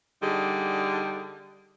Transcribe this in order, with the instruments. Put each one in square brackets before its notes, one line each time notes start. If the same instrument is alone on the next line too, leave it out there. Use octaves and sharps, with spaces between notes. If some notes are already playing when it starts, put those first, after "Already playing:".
[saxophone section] D3 G3 D#4 G#4